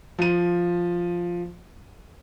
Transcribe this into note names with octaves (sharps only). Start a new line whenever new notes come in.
F3 D#7